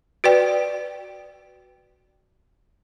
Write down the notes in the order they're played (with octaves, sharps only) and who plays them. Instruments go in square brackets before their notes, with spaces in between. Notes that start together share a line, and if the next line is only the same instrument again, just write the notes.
[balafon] F#4 B4 D5 G5